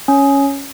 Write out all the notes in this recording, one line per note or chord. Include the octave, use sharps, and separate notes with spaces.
C#4